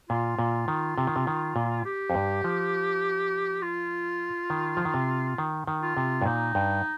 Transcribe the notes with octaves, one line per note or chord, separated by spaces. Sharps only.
A#2 F4
A#2
D#3
C3
D#3
C3
D#3
A#2
G4
F2
G2
F3
F4
D#3
F3
D#3
C3
D#3
D#3
F4
C3
G2
A#2 D#4
G2